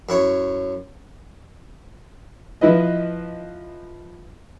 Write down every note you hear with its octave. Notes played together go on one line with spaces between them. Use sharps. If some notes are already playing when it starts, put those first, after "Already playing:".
F#2 E4 C#5
F3 E4 B4 D#5